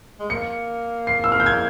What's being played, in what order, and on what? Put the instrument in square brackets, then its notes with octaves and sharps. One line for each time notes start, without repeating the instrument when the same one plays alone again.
[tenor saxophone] G#3
[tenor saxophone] A#3 [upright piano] C#7
[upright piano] C7
E6
F6
G6
G#6